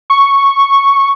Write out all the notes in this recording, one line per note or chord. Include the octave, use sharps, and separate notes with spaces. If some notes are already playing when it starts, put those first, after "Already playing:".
C#6